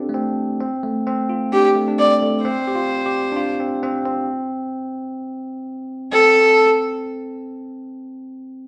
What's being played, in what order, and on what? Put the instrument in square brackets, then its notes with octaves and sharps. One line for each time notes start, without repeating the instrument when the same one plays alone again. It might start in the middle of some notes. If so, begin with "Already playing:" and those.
Already playing: [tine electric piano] C4 D4 F4 G4 A4
A3
C4
C4
A3
C4
F4
[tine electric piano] D4 [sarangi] G4
[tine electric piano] A3
D4
[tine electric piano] C4 [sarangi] D5
[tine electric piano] A3
[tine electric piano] C4 [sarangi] C5
[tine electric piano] G4
F4
G4
D4
F4
C4
C4
C4
[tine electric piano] C4 [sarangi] A4